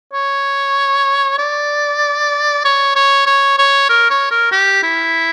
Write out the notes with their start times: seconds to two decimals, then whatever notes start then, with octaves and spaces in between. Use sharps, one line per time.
0.13 C#5
1.39 D5
2.65 C#5
2.96 C#5
3.26 C#5
3.58 C#5
3.89 A#4
4.10 C#5
4.31 A#4
4.52 G4
4.83 E4